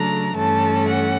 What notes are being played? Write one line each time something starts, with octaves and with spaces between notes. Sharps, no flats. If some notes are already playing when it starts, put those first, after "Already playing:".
Already playing: C#3 F#3 A3 D4 A#5
G2 E3 A3 C#4 A5
F#5